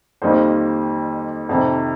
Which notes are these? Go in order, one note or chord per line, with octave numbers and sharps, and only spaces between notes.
F2 D#3 G3 A#3 D#4 C5
F2 C3 D#3